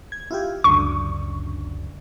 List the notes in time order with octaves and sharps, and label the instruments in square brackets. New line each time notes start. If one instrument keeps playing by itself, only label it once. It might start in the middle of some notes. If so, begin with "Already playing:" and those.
[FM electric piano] G#6
E4 F4 G4
[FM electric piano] C#2 F#2 D3 [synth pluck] C#6